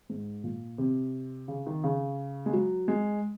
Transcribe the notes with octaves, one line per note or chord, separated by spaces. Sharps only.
G#2
A#2
C3
C#3
D#3
C#3
G#3
F#3
G#3